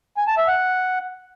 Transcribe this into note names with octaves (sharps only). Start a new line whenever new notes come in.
G#5
A5
E5
F#5